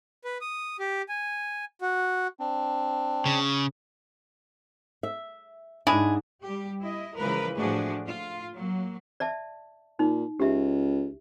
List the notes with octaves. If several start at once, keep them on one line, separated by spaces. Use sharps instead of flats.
B4
D#6
G4
G#5
F#4
C4 D4
C#3
E5
G#2 G#3 D4 E4 G#4
G3 G4
E4 D#5
C#3 E3 F3 G#3 A#4 B4
A2 F3 A3 D4 F#4 G#4
F4
F#3 A#3
D5 E5 A5
A#2 D#4
C#2 G4 E5